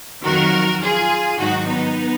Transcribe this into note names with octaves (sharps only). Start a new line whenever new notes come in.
F2 D#3 F#3 F#4 A#4
F4 G#4
G#2 D#3 F#3 D#4 F#4
B3 D#4